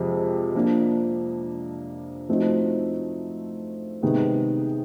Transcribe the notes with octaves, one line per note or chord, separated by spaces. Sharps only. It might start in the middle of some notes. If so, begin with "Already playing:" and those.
Already playing: F2 C3 G#3
F3 A#3 D4
F3 A3 C4 D#4 F#4
C3 D#3 G#3 B3